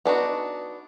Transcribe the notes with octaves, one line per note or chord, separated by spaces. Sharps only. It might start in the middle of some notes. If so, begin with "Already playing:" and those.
B3 D4 D#4 F#4